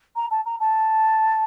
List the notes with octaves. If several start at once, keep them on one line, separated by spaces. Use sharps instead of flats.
A#5
A5
A#5
A5